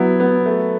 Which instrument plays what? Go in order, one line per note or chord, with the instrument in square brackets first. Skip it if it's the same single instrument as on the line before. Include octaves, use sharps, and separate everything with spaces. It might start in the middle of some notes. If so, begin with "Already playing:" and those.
Already playing: [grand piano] F#3 [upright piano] B3 E4
[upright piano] B3
A3